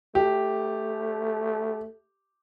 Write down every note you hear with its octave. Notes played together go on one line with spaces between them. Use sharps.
A3 G4